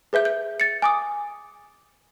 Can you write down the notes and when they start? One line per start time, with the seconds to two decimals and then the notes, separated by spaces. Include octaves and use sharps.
0.13 G#4 B4 E5 G6
0.25 G6
0.60 A6 C#7
0.82 G#5 D6 D#6